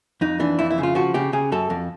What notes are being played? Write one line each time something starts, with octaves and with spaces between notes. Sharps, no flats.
F2 D#4
E3 D4
F2 E4
E4
C#3
F4
F3 F#4
C#3 G4
C#3 G#4
F#2 A4
F2